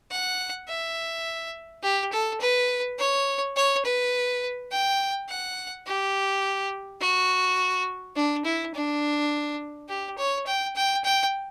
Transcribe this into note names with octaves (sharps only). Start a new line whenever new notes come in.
F#5
E5
G4
A4
B4
C#5
C#5
B4
G5
F#5
G4
F#4
D4
E4
D4
G4
C#5
G5
G5
G5